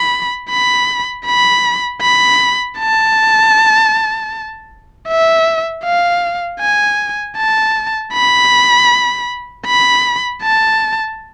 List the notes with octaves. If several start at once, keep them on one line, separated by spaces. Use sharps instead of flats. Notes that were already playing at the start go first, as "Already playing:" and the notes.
Already playing: B5
B5
B5
B5
A5
E5
F5
G#5
A5
B5
B5
A5